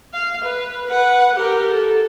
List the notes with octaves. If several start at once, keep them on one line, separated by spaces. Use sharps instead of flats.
F5
B4
B4 F#5
G4 A#4
A4